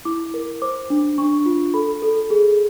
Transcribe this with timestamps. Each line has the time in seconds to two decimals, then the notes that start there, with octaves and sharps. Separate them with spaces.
0.05 E4 D6
0.34 A#4
0.62 C5 D6
0.90 D4
1.18 D4 C#6
1.46 F4
1.74 A4 B5
2.02 A4
2.30 G#4